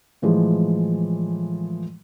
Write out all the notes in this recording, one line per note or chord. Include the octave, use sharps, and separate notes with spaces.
A2 E3 F3 G#3